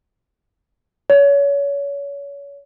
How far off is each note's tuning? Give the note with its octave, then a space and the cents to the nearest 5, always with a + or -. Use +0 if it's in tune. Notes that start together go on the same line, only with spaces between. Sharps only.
C#5 +30